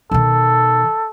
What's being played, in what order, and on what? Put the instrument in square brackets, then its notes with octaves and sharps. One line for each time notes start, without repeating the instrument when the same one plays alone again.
[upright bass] B2 D#3 [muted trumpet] A4